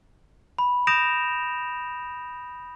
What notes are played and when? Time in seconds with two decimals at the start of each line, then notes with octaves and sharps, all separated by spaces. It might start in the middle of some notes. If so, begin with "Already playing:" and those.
0.59 B5
0.87 D#6 G6 A#6 D7 E7 F7